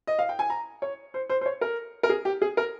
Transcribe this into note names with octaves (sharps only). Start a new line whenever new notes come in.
D#5
F5
G5
G#5
A#5
C#5
C5
C5
C5
C#5
A#4
A#4
G#4
G4
G#4
A#4